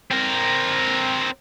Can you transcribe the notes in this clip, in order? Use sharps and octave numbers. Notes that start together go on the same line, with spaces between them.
C4 A#4